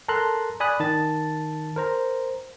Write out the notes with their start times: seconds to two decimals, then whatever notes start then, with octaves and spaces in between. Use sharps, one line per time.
0.08 A4 A#4 A5 A#5 C6 F#6
0.60 D5 G#5 B5 D#6 F#6
0.80 D#3 A5 A6
1.76 A#4 C5 A#5